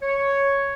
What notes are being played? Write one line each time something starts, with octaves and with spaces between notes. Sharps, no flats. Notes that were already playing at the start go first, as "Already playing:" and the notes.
C#5